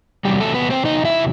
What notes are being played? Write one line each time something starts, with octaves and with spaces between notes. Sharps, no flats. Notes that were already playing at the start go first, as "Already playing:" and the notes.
E2 C3 F#3 G3 G4
A3 A4
B3 B4
C4 C5
D#4 D#5
E4 E5